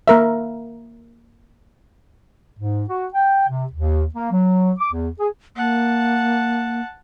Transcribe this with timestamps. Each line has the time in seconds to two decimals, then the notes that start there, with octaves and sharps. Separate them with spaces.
0.08 A#3 A#4 E5
2.58 G#2
2.88 F#4
3.14 G5
3.49 C3
3.72 D#2
4.14 A#3
4.31 F#3
4.79 D6
4.92 E2
5.20 G#4
5.56 A#3 F#5 A5